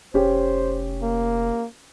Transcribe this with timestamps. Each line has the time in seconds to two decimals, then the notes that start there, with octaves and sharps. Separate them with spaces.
0.14 F1 C#4 G4 C5
1.02 A#3